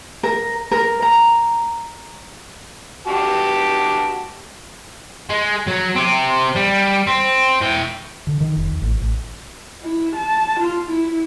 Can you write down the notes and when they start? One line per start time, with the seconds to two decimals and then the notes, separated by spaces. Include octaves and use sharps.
0.23 A#4
0.71 A#4
1.02 A#5
3.07 F#4 G4 A5
5.30 G#3
5.67 F#3
5.96 C4 G4
6.55 G3
7.07 C4
7.61 E4 G5
8.27 D3
8.41 D#3
8.56 F1
8.68 D#2
8.82 A1
8.99 A1
9.83 E4
10.16 A5
10.59 F4
10.89 E4